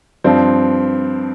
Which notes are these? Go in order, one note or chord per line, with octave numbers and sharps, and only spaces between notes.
G2 F3 C4